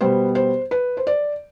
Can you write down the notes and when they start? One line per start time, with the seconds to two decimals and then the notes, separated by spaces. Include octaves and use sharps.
0.01 B2 G3 B3 C5
0.35 C5
0.71 B4
0.97 C5
1.07 D5